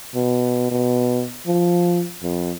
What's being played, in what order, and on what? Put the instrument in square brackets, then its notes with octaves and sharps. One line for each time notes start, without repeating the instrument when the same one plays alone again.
[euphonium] B2
B2
F3
F2